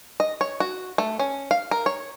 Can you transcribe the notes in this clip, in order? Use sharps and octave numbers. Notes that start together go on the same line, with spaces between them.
D#5
C#5
F#4
A3
C#4
F5
A#4
C#5